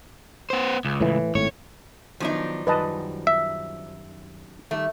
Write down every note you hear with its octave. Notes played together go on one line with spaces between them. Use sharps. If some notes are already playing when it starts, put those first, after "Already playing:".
B3 C5
C#2
A2 E3
G#1 A2 C#5
D#3 F3 F#3 B3 D4 D#4
F#2 D#3 G3 B4 D#5 A5
E5
D#3 G3 A3